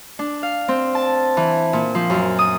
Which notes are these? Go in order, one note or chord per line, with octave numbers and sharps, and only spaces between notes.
D4
F5
C4
A5
E3
A#2
F3
F#2
D#6